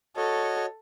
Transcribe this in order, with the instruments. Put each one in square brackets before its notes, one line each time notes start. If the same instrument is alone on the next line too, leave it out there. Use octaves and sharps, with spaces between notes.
[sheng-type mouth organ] F#4 C#5 D#5 [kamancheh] A4